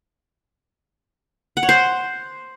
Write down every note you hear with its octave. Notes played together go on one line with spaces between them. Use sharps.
F#5
C#5
C5